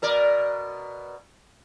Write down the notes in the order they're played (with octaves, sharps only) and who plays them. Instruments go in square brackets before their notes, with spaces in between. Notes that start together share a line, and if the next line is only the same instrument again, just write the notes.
[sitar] B2 A#4 D5